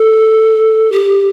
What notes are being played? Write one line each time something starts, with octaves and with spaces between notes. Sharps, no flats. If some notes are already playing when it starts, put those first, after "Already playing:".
Already playing: A4
G4